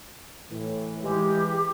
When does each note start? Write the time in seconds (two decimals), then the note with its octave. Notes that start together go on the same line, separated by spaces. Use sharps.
0.50 A2 E3
1.03 E3 G#3 G4